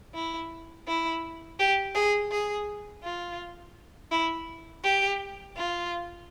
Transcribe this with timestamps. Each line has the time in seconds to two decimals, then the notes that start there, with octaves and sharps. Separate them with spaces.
0.14 E4
0.87 E4
1.59 G4
1.95 G#4
2.31 G#4
3.03 F4
4.11 E4
4.83 G4
5.56 F4